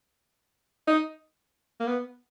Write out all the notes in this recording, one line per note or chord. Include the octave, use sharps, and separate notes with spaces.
D#4
A#3
B3